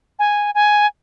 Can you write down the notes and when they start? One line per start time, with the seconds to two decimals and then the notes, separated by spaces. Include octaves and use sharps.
0.19 G#5
0.55 G#5